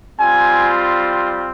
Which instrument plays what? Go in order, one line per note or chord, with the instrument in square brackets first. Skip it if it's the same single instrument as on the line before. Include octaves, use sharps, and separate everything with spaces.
[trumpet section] G3 C4 F4 G#5